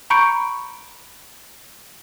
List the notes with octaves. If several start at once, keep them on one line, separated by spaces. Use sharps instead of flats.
A#5 B5 C#6 G6 C#7 D7